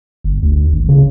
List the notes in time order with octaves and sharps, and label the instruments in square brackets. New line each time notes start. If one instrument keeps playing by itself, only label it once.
[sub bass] G1
D2
G#1
C#3